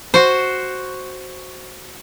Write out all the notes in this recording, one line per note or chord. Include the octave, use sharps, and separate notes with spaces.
F#4 C5